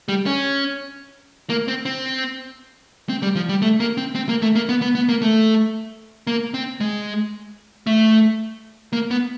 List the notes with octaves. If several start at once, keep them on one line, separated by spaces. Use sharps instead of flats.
G3
C#4
A#3
C4
C4
C4
G3
F3
G3
A3
A#3
C4
C4
A#3
A3
A#3
B3
B3
B3
A#3
A3
A#3
C4
G#3
A3
A#3
B3